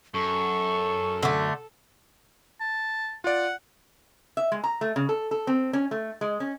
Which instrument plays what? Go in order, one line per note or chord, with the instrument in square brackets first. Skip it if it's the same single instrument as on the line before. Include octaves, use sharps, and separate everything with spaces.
[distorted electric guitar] F#2 [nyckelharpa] A4 [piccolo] C#6
[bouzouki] D3 A3
[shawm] A5
[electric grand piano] F4 D5 [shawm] F#5
[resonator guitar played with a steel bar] E5
G#3
A#5
A3
C#3
A4
A4
C4
C#4
A3
G#3
C#4